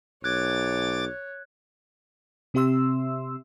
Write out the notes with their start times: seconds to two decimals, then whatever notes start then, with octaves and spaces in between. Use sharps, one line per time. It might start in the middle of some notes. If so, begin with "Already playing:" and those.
0.24 B1 C#5 D6 F#6 G#6 A6
2.54 C3 C4 G4 E5 C6 E6